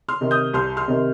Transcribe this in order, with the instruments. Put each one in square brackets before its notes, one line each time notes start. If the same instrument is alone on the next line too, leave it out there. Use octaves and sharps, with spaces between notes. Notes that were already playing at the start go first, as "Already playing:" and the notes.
[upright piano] C6 F6
C3 D#3
D#6 G6
C2 C6 F6
C6 F6
C3 D#3